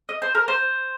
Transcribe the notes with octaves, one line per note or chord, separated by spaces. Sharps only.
D#5
C5
A#4
C5